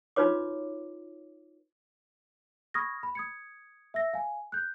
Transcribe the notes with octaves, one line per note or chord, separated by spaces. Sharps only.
D#4 F4 F#4 B4 C#5 D6
B5 C#6 D#6 F6 G#6 A#6
B5
D#6 G#6 C#7
E5 E6 A#6
F5 G#5
F#6 G6